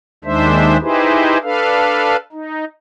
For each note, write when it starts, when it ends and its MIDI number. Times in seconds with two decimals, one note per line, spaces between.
0.24 0.77 39
0.24 0.77 51
0.24 0.77 56
0.24 0.77 62
0.24 0.77 72
0.24 0.77 76
0.81 1.38 63
0.81 1.38 64
0.81 1.38 67
0.81 1.38 68
0.81 1.38 71
0.81 1.38 72
1.43 2.16 62
1.43 2.16 69
1.43 2.16 71
1.43 2.16 77
2.32 2.65 63